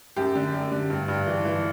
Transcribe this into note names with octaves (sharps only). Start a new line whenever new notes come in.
F#2 G4
D3
F#2
D3
G2
G2
E3
E3